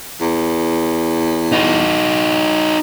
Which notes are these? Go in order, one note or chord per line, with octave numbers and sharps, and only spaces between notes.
E2
D#4 F#4